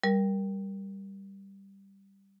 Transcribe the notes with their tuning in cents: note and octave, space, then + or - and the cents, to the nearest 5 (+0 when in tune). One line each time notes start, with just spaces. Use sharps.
G3 +0 A#4 +15